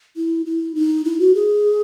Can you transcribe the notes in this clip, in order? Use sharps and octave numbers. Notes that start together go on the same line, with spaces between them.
E4
E4
D#4
E4
F#4
G#4